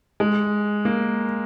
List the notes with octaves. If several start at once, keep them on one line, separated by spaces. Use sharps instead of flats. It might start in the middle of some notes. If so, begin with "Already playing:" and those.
G#3
A#3